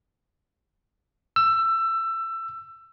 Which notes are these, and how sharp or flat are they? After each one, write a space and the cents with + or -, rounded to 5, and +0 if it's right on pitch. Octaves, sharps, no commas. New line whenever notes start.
E6 +20